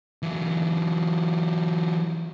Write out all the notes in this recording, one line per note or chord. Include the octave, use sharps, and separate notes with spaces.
E3 F#3